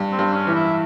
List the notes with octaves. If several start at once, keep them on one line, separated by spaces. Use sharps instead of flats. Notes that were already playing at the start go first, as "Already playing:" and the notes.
Already playing: G2
C4
G2
C#4
E3
E4